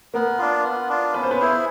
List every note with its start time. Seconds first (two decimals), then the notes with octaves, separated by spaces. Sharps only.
0.14 A#3 B3 A#4
0.38 D4 F4
0.64 B3
0.90 D4 F4
1.14 B3 C#4 B4
1.23 C5
1.31 B3 B4
1.40 E4 G#4 C5